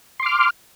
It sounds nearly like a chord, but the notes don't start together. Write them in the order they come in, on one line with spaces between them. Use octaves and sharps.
C6 D6 F6